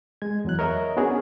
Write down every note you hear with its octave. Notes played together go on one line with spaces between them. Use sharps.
G#3 G#6
E2 F#3 F#6
A#4 C#5 D#5 E5
B3 C#4 D4 F#4 G#4